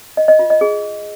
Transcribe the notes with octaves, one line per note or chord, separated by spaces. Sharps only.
D#5
D#5
F4
D#5
G#4